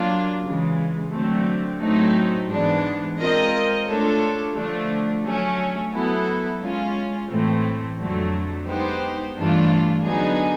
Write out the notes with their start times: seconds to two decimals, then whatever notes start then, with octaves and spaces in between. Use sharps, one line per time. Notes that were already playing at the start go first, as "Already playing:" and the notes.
Already playing: F#3 A#3 D4 F4
0.43 C#3 E3 G#3
1.11 D3 F#3 A3 C4
1.81 A2 F#3 A3 C4 D#4
2.49 G#2 E3 G#3 B3 D4
3.18 G#3 C4 F4 A#4 D#5
3.87 A3 D4 F4 A4 C#5
4.55 D3 F3 A3 D4
5.23 F#3 A3 C#4
5.92 F#3 B3 E4 A4
6.61 G#3 C#4 F4
7.29 A2 E3 A3 C4
7.98 F2 D3 F#3 A3
8.66 G#3 B3 D#4 G4 C5
9.35 G2 E3 A3 D4 F4
10.04 D3 F#3 B3 D#4 G#4